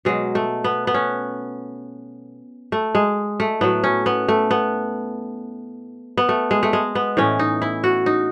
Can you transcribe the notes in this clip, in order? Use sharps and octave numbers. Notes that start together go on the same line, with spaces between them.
B2 F#3 G#3
A3
B3
B3
C#4
A3
G#3
A3
A2 F#3 B3
C#4
B3
A3
B3
B3
A3
G#3
A3
G#3
B3
A2 E3 C#4
D#4
E4
F#4
D#4